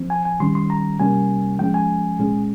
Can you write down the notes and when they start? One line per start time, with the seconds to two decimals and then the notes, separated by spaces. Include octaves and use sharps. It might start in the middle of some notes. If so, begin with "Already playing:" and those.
Already playing: F3 C4
0.10 G#5
0.25 G#5
0.40 D#3 G3 C#4 C6
0.55 C6
0.70 A#5
0.99 C3 G3 A#3 C#4 G#5
1.59 F3 G#3 C#4 G5
1.74 G#5
2.19 A#2 G#3 C#4